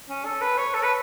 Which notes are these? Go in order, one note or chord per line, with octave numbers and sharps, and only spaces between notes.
C#4
A4
B4
C#5
A4
B4